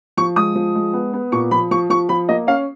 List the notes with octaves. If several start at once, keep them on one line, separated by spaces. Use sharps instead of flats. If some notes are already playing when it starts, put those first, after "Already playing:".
F3 C#6
G#3 D#6
F3
G#3
B3
B3
A#2 C#6
F3 B5
F3 C#6
F3 C#6
F3 B5
A#3 D#5
C#4 F5